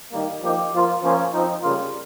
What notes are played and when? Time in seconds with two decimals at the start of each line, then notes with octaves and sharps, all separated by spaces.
0.11 D#3 G3 A#3
0.42 F3 A#3 D#4 G4
0.72 F3 A#3 F4
1.02 F3 A#3 C#4 F4
1.32 F3 C4 D#4
1.63 C#3 G3 A#3 F4